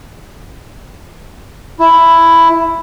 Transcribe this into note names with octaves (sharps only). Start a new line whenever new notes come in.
E4